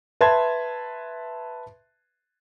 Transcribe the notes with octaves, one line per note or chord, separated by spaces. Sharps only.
B4 E5 A5 C6 G#6